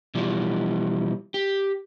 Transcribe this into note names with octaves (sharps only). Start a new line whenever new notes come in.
B2 E3 F3 G3
G4